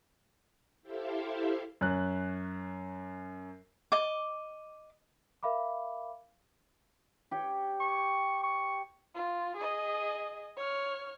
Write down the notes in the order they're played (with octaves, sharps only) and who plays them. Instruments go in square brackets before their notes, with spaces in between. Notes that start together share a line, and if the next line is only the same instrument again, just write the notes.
[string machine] E4 G4 A4 C5 E5 F5
[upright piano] F#2 C#4 F#6
[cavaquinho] D#5 D6
[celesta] A#4 E5 F5 B5 D6
[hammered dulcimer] G4 C#5 G5
[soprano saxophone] C#6
C#6
[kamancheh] F4
G#4 D#5
C#5 F6